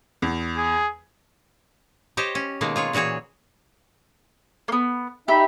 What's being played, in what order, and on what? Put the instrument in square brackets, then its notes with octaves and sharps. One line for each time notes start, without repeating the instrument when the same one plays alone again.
[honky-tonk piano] E2
[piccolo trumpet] G#4
[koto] G4 C5 C#5 D#5
C#4
B2 D#3 G#3 A#3
F4 G#4 C#5
A#2 E3 F#4 G#4 C#5
[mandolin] A#3 B3
[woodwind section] D#4 E5 B5 [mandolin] G4